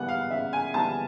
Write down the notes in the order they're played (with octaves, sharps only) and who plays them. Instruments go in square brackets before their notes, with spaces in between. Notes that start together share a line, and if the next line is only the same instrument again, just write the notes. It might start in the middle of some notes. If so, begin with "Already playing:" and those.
Already playing: [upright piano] C#3 E3 G3 B3 F#5
F5
C#3 E5
G#5
E3 G3 B3 A5